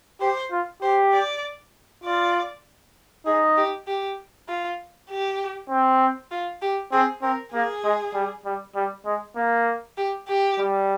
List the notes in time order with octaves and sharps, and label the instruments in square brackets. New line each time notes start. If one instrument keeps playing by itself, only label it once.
[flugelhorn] G4 [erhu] C5
[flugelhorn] F4
[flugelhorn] G4 [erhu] C5
[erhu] D5
[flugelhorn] F4 [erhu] D5
[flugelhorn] D#4 [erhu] G#4
[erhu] G4
G4
F4
G4
[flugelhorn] C4
[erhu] F4
G4
[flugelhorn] C4 [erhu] G#4
[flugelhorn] C4 [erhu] A#4
[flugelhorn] A#3 [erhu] G#4
[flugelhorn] G#3
G3
G3
G3
G#3
A#3
[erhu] G4
G4
[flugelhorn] G3